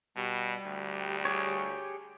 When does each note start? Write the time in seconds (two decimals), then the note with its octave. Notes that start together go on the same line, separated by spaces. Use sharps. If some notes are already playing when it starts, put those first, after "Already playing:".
0.16 B2 G3
0.66 D2
1.25 G4 G#4 C#5